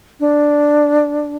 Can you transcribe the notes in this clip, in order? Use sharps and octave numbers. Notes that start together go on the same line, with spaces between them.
D4